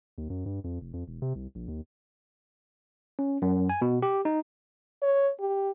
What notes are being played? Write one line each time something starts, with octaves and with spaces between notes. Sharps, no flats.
D#2
F#2
G2
F2
F1
F2
E1
C3
C2
A#1
D#2
C#4
F#2
G#5
B2
G4
D#4
C#5
G4